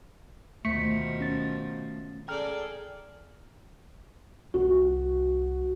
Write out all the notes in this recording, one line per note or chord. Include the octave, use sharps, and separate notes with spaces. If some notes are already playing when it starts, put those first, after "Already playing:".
D2 B2 D#3 F3 A3 B6 C#7
C#4 A6
G#4 A4 D5 G5 A#5 F6
C2 F#4